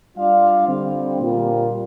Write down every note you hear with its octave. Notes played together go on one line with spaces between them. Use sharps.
G3 D4 F4 D5 F5
D3 G3 C4
A#2 G3 A#3 F4